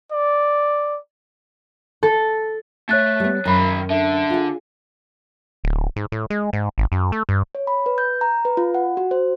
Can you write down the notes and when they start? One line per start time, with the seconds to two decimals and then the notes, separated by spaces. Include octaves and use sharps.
0.12 D5
2.03 A4
2.89 A3 C#5 F#6 A6
3.20 G3 B3
3.45 F#2 D#3 B5
3.90 D3 E5
4.30 F4 G#4
5.64 D1
5.96 G#2
6.12 A2
6.30 G#3
6.53 G#2
6.78 G#1
6.92 F#2
7.12 A3
7.29 G2
7.55 C#5
7.67 B5
7.86 B4
7.98 G6
8.21 A#5
8.45 B4
8.57 F4
8.74 F#5
8.97 F#4
9.11 C5